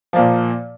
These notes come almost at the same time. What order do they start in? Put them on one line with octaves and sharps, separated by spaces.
F3 A#3 A#2